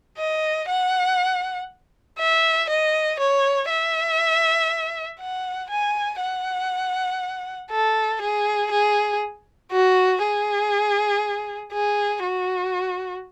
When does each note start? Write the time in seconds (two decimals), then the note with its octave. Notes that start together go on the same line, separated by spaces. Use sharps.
0.18 D#5
0.68 F#5
2.19 E5
2.69 D#5
3.20 C#5
3.70 E5
5.20 F#5
5.70 G#5
6.20 F#5
7.71 A4
8.21 G#4
8.71 G#4
9.72 F#4
10.22 G#4
11.73 G#4
12.23 F#4